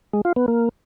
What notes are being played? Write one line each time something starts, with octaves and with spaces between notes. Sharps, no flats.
G#3
F4
B3
A#3